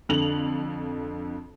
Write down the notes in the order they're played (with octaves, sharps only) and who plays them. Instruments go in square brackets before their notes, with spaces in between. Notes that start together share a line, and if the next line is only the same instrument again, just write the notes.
[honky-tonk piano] F2 D3 F7 F#7